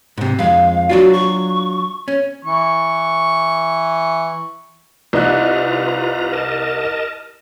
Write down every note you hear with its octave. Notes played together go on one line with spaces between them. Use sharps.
G#2 C3
F2 G#3 F5
F#3 D4 F4 F#4
C#6
C#4
E3 C#6
C2 D#4 F4 B4 A#5 F#6
A#4 D#5 A5